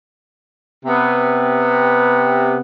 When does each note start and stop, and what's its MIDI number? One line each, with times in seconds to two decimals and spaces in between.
0.85 2.57 48
0.85 2.57 59